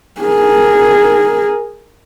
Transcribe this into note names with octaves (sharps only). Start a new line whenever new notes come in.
G#4 A#4